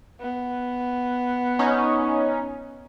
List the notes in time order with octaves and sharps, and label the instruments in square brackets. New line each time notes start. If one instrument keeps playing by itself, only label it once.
[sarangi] B3
[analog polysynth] C#4 D#4